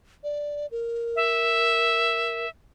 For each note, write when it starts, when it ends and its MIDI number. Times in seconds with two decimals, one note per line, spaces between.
0.24 0.66 74
0.71 2.46 70
1.16 2.49 76